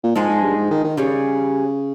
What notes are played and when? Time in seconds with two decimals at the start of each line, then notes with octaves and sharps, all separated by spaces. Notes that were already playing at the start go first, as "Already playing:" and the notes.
0.04 A#2
0.16 G#2 F3 G#3 D#4 G#4
0.29 G#2
0.43 G2
0.56 G#2
0.71 D#3
0.84 D#3
0.97 C#3 G3 C#4 G#4